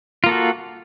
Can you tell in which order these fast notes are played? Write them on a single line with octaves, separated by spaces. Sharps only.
F4 A#3 A4 F#4